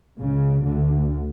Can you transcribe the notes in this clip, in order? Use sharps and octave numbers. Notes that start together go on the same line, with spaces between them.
C#2 C#3
D2 D3